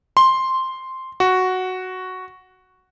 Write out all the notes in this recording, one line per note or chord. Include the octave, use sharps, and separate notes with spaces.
C6
F#4